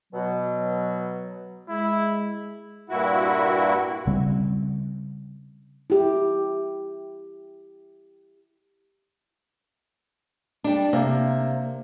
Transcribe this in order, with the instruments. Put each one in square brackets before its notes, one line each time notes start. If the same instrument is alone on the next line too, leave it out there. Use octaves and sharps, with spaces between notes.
[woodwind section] B2 F#3
[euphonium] G#3 [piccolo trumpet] E4
[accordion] G2 A#2 E4 F#4
[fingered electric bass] C#3 G3 C4
[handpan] E4 G4
[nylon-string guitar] G3 D4
[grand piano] C3 [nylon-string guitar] A#3